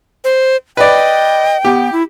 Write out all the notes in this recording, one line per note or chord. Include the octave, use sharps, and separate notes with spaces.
C5
B4 D5 D#5 G5
B3 G4
E4